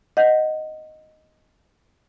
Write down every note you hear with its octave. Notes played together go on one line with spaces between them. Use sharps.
D#5 F#5 G6